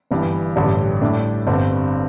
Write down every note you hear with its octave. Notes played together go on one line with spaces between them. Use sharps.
G1 G2 E3
A1 G2 D3 G3
A2 G3 D4 A4
G1 G2 D3 C4